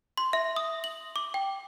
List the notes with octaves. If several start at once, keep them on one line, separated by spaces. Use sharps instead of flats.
C6
E5
D#6
F#7
D6
G5